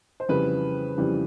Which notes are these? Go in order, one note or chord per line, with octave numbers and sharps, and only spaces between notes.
C5
F2 C#3 E3 G3 B4
F2 C#3 E3 G3